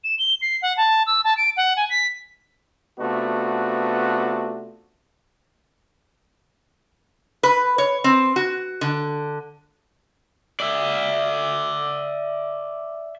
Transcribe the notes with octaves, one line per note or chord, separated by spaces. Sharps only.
E7
G7
C7
F#5
A5
E6
A5
D7
F#5
G#5
B6
C3 A3 B3 D4 F4 F#4
B4
C#5
C4
F#4
D3
D5 E5